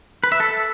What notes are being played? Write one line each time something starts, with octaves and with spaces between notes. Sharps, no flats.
B4
E5
A4